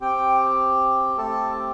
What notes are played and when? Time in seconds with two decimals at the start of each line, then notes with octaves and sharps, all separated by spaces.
0.01 C4 G4 G5
1.17 A3 C4 G4 A4 A5